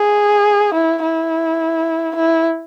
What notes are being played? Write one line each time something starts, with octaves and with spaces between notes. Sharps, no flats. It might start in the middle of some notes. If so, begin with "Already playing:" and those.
Already playing: G#4
E4
E4
E4